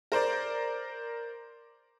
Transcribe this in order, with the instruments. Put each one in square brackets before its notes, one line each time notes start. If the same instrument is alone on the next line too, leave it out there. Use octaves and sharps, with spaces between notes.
[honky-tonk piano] A#4 C5 D5